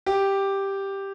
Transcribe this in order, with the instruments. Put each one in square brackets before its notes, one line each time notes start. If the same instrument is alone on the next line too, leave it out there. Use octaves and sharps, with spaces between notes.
[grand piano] G4